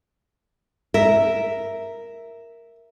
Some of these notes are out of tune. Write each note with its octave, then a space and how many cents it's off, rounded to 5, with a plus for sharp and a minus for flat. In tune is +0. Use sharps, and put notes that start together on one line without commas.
A#4 +0 E5 +0